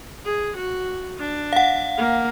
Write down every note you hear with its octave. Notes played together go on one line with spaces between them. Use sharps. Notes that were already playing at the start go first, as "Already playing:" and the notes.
G#4
F#4
D4
F5 F#5
A#3